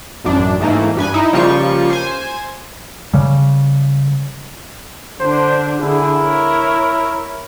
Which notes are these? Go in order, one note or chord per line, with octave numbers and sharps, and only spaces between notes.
A1 F#2 D4
G#2 E3 A3 A#3
G2 B4 G#5
D#4 E4
C#3 F3 G3 A#3 F4 C#6
C5 G#5
C#3 G3
D3 D4 C5
D3 E4 G#4
A#4 C#5